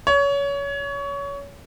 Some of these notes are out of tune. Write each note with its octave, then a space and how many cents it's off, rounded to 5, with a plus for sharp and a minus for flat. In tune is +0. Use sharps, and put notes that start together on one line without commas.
C#5 +25